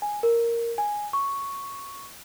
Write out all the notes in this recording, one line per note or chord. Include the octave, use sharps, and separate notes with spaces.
G#5
A#4
G#5
C#6